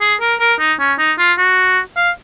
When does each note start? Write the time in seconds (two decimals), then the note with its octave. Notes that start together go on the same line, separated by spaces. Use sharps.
0.01 G#4
0.21 A#4
0.40 A#4
0.60 D#4
0.79 C#4
0.99 D#4
1.19 F4
1.38 F#4
1.96 F5